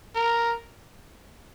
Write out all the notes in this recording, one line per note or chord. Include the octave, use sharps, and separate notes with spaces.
A#4